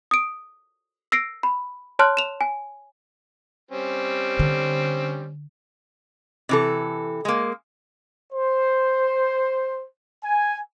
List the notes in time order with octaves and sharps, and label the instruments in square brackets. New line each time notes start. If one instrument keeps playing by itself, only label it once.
[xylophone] D#6 D7
E6 A#6 C7 D7
B5
C#5 A5 C6 F6 F#6
E7 F7
G#5
[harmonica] G3 C4 C#4
[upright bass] D3
[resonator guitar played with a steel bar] C3 E3 A4
G#3 A#3
[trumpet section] C5
G#5